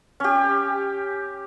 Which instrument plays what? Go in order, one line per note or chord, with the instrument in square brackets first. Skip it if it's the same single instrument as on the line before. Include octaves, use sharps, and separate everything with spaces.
[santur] C#4 G4